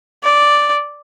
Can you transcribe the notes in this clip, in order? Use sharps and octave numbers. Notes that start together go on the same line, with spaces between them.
D5